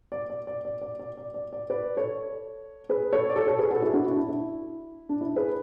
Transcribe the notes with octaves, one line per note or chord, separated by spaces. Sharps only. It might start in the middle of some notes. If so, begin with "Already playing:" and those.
D5
D5
D5
D5
D5
D5
D5
D5
D5
B4 D5
A4 C#5
G#4 B4
A4 C#5
D5
A4 C#5
A4 C#5
G#4 B4
F#4 A4
E4 G#4
D4 F#4
E4
D4
E4
D4
E4
G#4 B4